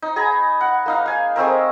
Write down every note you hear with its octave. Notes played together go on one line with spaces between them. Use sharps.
D#4
G#4 G#5 A#5 B5
F#5
A#3 D#4 F5
F5 G#5
G#3 A3 C4 A#4